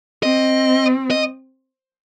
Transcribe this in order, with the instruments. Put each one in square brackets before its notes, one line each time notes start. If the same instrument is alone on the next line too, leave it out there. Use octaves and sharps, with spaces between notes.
[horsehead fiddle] C4 [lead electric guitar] D#5
[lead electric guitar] D#5